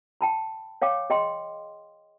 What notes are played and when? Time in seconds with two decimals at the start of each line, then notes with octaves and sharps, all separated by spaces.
0.21 G5 A5 B5
0.82 C#5 F5 G5 D6
1.10 G#4 D#5 G5 C6